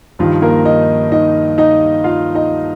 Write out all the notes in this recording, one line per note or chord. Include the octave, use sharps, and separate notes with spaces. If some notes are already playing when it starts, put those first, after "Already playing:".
G2 D#3 F3 F4
A#3 A#4
D#4 D#5
D#4 D#5
D#4 D#5
F4 F5
D#4 D#5